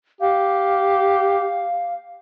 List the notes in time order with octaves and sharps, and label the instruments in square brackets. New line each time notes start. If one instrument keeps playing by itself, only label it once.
[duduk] G4 [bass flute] F5